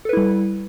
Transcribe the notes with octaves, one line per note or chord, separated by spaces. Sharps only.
G3 E4 A4 B4